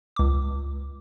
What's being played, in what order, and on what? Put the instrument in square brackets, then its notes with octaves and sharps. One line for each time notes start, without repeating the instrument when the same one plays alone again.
[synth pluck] C#2 D6